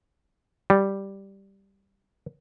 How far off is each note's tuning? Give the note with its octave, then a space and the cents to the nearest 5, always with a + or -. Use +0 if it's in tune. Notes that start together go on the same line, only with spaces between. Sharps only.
G3 +0